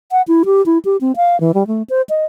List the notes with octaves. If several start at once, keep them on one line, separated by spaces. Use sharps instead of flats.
F#5
E4
G4
E4
G4
C4
F5
E3
G3
A3
C5
D#5